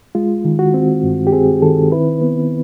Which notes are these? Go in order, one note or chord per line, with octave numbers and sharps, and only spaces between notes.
G#3 F4
D#3
F#4
C4
G2
G4
C4 G#4
D#3 A4
E4 B4
B3